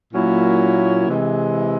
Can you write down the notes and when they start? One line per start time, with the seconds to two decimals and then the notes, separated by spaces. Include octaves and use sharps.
0.13 A#2 F#3 A#3 C#4 E4
1.07 C3 E3 G#3